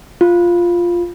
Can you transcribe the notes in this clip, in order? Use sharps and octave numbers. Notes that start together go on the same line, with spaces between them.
F4